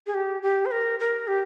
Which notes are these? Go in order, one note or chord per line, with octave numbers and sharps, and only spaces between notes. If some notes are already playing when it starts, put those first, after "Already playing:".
G#4
G4
G4
C5
A#4
A#4
G4